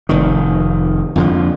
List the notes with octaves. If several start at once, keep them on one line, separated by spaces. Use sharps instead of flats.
F1 D#3
F2 D3 F3